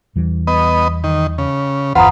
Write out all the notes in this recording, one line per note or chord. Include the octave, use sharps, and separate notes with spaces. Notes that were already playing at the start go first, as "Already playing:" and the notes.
E2 E3 G3
B3 D#5
D#3
C#3
G1 E2 F4 B4 C5 F#5 A#5 D#6